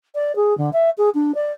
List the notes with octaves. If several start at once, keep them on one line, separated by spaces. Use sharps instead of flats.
D5
G#4
D3
E5
G#4
D4
D5